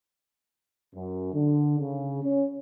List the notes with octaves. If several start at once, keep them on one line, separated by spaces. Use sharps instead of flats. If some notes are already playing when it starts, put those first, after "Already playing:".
F#2
D3
C#3
C#4